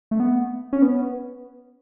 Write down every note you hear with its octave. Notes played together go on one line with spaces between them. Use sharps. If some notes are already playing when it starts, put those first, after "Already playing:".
A3
B3
C#4
B3